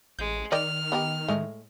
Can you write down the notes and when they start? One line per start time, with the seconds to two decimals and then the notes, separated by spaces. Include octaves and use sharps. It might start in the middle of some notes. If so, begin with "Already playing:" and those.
0.19 A1 G#3 G6
0.52 D#3 A#4 D5 D#5 G5 F6
0.92 B3 D#4 G4
1.28 A2 G#3 A3